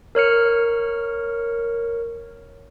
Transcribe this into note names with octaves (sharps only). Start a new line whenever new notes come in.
A#4 C#5 F6 C#7